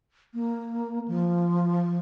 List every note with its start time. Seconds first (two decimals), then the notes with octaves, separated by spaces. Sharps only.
0.34 A#3
1.08 F3